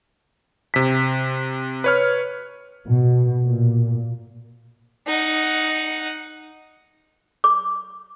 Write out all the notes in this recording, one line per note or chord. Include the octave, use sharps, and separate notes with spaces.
C3 B6
B4 C#5 F6
B2
A#2
D#4 F#5
D6